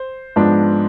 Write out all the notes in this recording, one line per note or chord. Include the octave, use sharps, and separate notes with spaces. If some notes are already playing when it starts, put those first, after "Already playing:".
Already playing: C5
G#2 F3 B3 D4